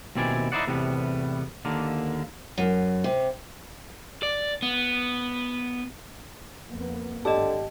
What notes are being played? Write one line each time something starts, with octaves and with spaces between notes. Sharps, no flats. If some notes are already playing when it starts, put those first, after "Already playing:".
D#2 B2 C4 E4 D5 G#5
D#4 E4 B4 C5 D5 F#5
E2 A2 C3 G3 B3
D#2 D3 A#3
F#2
C3
D5
B3
F2 A#3 B3
G#1 G2 D3 G4 D#5 A5